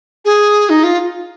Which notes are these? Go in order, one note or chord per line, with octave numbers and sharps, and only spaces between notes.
G#4
D#4
F4